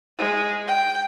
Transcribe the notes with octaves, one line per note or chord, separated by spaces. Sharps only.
G#3
G5